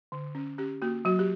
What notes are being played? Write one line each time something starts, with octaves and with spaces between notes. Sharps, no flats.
D3
C#4
C#4 G4
A#3 F#4
F#3 F#4
G4